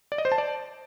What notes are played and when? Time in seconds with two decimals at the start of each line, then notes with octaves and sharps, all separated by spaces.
0.12 D5
0.18 D#5
0.25 C5
0.32 A5
0.38 D5